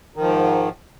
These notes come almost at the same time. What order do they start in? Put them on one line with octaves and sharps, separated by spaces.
D#3 F3 G#2